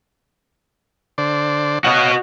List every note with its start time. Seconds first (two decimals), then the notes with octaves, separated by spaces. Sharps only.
1.18 D3 C5 D5
1.84 F#4 C#5 D#5 F5 F#5